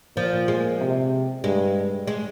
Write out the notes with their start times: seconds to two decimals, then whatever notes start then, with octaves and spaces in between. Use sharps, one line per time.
0.16 A#2 F3
0.48 G#3
0.80 C3
1.44 G2 G#3
2.07 G#3